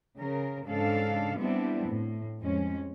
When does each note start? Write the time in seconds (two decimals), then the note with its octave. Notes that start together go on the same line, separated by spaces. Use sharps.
0.18 C#3 A#4
0.65 G#2 C#3 D4 A4 F5
1.38 G3 B3 C4 D4 E4
1.89 A2
2.41 F2 G#3 C#4